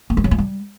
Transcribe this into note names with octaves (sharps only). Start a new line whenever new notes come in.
A#3
G3
F#3
F4
G3